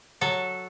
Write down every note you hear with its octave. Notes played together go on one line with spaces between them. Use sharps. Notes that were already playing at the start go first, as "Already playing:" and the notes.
F#3 A4